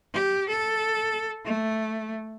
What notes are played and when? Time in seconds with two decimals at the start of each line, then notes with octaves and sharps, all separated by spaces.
0.14 G4
0.49 A4
1.45 A3